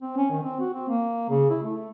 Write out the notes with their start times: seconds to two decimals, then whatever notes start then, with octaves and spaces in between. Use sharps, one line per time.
0.02 C4
0.17 C#4
0.31 D#3
0.43 C4
0.60 F#4
0.74 C4
0.90 A#3
1.30 C#3
1.50 E4
1.63 A3